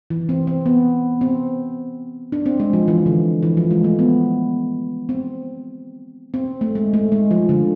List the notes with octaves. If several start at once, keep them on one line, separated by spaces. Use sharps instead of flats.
E3
C4
C4
B3
C4
D4
C4
G#3
F3
E3
D3
E3
F3
G#3
A3
B3
C4
C4
A3
G#3
A3
G#3
F3
D3